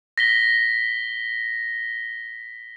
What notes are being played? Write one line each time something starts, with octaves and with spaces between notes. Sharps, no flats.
A#6 B6 G7